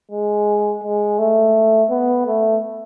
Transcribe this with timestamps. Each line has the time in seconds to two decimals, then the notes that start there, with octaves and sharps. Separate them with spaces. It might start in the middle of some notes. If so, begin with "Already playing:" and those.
0.12 G#3
0.84 G#3
1.19 A3
1.90 B3
2.26 A3